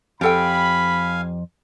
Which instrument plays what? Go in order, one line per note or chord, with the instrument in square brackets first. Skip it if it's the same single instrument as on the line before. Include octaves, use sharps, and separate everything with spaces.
[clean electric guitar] F2 [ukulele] G4 A4 G5 [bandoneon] F5 G#5 [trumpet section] B5